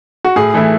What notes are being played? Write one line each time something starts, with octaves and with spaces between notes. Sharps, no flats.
F#4
A2 G#4
E3 A3 E4